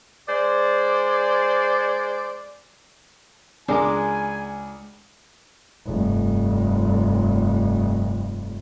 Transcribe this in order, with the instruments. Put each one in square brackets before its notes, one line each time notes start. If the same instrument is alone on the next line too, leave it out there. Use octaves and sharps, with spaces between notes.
[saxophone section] G#3 C5 D5
[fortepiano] C#2 D6 [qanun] G#3 [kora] D4 A#4 [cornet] G#5
[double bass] F1 G2